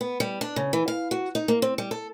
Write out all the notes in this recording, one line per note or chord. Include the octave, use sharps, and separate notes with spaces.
B3
G3
D4
C#3
E3
F5
F#4
D#4
A#3
C4
G3
A4